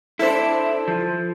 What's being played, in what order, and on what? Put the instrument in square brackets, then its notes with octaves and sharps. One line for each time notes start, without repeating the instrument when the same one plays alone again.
[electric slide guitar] D4 E4 [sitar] A4 C5
[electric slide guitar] F3